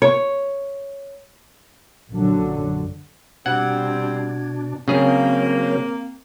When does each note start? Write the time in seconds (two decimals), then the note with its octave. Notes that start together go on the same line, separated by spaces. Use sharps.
0.02 C#5
2.11 A#1 F#2 D3 F#3
3.46 B2 G3 C4 D4 F#5 G#6
4.88 C#3 F#3 A#3 C4 G#4 A#4 C5